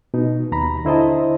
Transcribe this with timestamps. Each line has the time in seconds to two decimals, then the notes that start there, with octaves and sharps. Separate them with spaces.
0.14 B2 D#4
0.52 D#2 A#5 B5
0.85 D3 E4 C5 D#5 A5